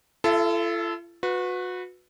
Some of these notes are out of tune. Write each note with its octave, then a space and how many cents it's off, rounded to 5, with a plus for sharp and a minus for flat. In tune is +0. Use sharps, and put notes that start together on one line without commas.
F4 -45 A4 -5 E5 +15
F#4 -30 B4 +5